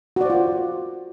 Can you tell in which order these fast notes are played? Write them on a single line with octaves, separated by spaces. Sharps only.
F#4 D5 C5 F4 A#4